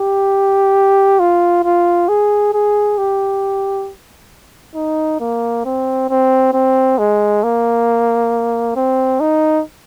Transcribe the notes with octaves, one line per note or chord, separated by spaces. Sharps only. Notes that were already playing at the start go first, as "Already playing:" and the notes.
Already playing: G4
F4
F4
G#4
G#4
G4
D#4
A#3
C4
C4
C4
G#3
A#3
C4
D#4